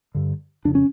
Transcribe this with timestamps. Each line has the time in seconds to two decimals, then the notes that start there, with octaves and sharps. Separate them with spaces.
0.15 G2 D3
0.65 F2 C#3 D4
0.75 C#4